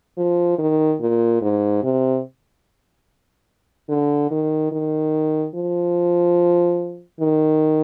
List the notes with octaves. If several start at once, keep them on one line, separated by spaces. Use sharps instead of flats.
F3
D#3
A#2
G#2
C3
D3
D#3
D#3
F3
D#3